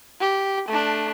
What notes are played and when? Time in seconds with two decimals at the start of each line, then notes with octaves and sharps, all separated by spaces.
0.20 G4
0.68 A3 D4